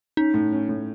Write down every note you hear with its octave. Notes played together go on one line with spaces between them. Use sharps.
C#4 D#4
A2
C#4
A2